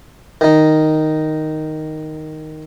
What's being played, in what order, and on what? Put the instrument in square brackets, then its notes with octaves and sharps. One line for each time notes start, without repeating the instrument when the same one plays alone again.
[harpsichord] D#3 D#4